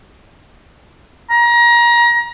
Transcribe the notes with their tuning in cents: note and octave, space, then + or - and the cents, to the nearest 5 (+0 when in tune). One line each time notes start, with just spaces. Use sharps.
A#5 +30